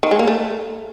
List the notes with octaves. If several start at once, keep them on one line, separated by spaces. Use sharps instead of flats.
D#3
G#3
A#3
A3